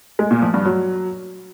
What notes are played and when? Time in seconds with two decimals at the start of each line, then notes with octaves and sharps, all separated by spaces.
0.19 G#3
0.31 A#2
0.42 F3
0.54 G2
0.65 F#3